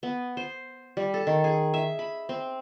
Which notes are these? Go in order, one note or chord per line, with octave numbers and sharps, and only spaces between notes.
B3
C5
G3
A4
D#3
G#4
E5
B5
C4